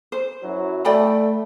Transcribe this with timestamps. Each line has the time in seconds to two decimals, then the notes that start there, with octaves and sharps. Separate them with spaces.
0.12 C5
0.43 F#2 F#3 E4
0.85 A3 D5 G5 B5